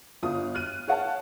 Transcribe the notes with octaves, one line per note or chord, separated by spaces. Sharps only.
G1 F4 D#6
F6 F#6 D#7
G#4 C#5 F5 F#5 A5